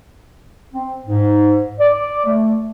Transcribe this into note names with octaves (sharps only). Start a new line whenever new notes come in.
C4
G#2
D5
A3